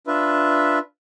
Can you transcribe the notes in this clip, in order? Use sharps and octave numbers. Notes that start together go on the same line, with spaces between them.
D4 F4 B4 E5